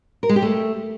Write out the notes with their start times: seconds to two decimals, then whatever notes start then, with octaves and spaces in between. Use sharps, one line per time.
0.23 A#4
0.29 G#3
0.36 G4
0.42 A3